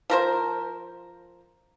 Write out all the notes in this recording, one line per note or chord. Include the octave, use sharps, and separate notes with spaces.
F3 A#4 C5